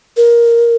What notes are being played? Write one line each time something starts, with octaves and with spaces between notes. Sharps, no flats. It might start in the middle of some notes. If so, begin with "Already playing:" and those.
A#4